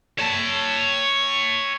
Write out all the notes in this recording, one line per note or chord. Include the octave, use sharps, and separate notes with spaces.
C#5 A5